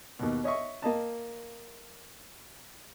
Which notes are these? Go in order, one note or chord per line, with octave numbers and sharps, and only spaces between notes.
D#2 B2
C#5 D#5 E5 C#6
A#3 D#5 A5